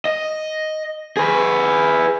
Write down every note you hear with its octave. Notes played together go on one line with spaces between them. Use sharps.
D#5
G#4 B4